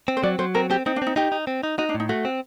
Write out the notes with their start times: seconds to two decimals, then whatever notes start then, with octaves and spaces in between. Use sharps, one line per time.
0.08 C4
0.17 C5
0.23 F#3 D5
0.39 F#3 C5
0.55 C4 A#4
0.70 C4 G4
0.86 C4 D#4
0.96 D4
1.02 C4 D#4
1.16 D#4 G4
1.32 D#4
1.47 C4
1.63 D#4
1.78 D#4 F#4
1.89 D4
1.95 A2
2.00 D#4
2.09 A3 F#4
2.25 C4